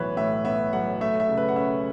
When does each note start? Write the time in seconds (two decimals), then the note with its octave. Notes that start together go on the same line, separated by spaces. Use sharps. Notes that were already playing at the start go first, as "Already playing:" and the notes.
Already playing: B1 A2 E3 B3 B4 C#5 E5
0.17 A2 E5
0.45 B3 E5
0.73 B1 F#5
1.01 A3 E5
1.20 E5
1.29 C#3
1.38 B4
1.48 F#5
1.56 C#4 E5